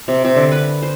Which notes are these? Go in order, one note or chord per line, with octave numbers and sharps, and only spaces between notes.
C3
C3
D3
B4
C5